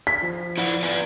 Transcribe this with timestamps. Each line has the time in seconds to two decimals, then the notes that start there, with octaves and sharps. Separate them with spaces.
0.07 B6
0.22 F3
0.58 E4 D5 F#5
0.83 B4 D5 G#5